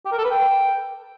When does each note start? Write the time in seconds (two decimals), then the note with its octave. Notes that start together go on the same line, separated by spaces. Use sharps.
0.05 G4
0.12 A#4
0.18 A4
0.24 B4
0.31 G5